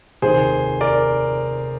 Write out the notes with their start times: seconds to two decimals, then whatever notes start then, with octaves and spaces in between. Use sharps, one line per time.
0.22 F1 D#2 D#3 G#4 C5
0.81 A#4 D5